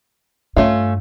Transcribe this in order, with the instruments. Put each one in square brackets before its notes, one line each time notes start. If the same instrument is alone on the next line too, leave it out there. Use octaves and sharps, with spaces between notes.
[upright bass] G2 [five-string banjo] A3 C#4 F4